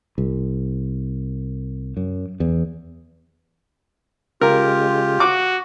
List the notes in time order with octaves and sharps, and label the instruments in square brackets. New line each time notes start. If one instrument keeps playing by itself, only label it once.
[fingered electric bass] C2
F#2
E2
[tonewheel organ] C#3 G#3 [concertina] F4 G4 [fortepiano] A#4
[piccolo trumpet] F#4 [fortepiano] D6